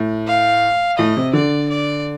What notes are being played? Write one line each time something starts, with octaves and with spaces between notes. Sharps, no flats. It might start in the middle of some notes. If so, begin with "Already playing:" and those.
Already playing: A2
F5
A2 D#5
C3
D3 D5
D5